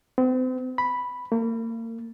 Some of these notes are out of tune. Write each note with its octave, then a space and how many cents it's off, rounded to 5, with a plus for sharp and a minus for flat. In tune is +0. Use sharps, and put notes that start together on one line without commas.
C4 -40
B5 -5
A#3 -35